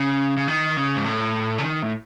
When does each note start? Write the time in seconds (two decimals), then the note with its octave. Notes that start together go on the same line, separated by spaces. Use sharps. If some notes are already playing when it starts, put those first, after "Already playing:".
Already playing: C#3
0.37 C#3
0.48 D#3
0.77 C#3
0.96 G#2
1.06 A2
1.58 C#3
1.63 D#3
1.82 A2